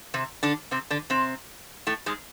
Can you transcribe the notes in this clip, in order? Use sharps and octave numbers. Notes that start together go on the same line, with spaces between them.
C3 C4
D3 D4
C3 C4
D3 D4
C3 C4
A2 A3
G#2 G#3